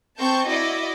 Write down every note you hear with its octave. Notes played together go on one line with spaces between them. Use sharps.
C4 A5 C#6 G6
E4 F#4 D5 D#5